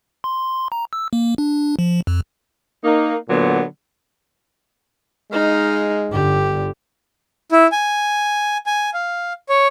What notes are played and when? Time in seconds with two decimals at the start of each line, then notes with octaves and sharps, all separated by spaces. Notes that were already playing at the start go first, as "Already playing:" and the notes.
0.24 C6
0.72 A#5
0.93 E6
1.13 A#3
1.38 D4
1.79 F3
2.07 F2
2.83 A#3 D#4
3.28 A#2 D3 F#3 B3
5.32 G#3 D#4 F5
6.12 G1 D3 G4
7.52 E4
7.72 G#5
8.66 G#5
8.94 F5
9.49 C#5